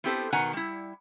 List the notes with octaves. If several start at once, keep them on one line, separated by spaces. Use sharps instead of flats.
B3 C4 E4 G4 A4 C5
B2 D#3 B4 F#5 G#5 A#5
G3 E4